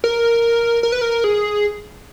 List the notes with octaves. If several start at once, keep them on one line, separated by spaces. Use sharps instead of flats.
A#4
A#4
B4
A#4
G#4